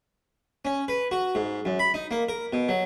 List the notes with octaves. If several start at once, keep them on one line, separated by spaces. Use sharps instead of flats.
C#4
B4
F#4
G#2
F#2
B5
D#4
A#3
A#4
B2
F#3